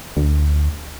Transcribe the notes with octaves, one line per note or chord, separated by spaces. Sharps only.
D2